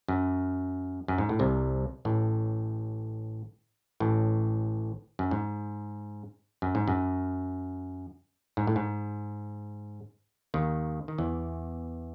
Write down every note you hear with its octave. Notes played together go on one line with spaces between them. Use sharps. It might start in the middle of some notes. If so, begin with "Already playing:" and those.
F#2
F#2
G#2
A2
C2 C3
A1 A2
A1 A2
F#2
G#2
F#2
G#2
F#2
G#2
A2
G#2
D#2 D#3
D#3
E2 E3